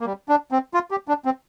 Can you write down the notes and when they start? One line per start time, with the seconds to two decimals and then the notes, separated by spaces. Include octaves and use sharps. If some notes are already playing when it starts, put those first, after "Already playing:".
0.01 A#3
0.06 G3
0.29 D4
0.51 C4
0.74 F4
0.91 G4
1.08 D4
1.25 C4